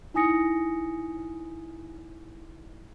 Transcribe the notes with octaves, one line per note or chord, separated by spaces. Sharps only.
D#4 E4 G#5 D#6 A#6 C#7